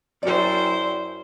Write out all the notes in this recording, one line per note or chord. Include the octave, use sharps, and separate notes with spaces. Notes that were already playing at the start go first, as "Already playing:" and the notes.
F#2 E4 C5 D5 G5